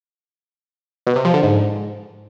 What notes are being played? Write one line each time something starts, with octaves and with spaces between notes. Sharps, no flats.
B2
C3
F3
D3
G#2